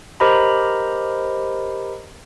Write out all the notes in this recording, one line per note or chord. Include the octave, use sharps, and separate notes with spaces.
G4 A#4 C5 D#5 A#5 B5